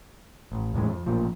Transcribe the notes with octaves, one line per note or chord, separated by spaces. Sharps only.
A1
E2 A2 E3 G#3
F2
A1 A#2 F3